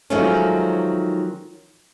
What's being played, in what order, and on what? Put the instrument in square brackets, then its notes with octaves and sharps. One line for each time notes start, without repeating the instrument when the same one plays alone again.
[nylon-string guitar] D#3 F3 F#3 G#3 A3 C#4